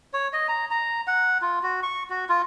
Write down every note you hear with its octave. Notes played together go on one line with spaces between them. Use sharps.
C#5
D#5
A#5
A#5
F#5
F4
F#4
C#6
F#4
F4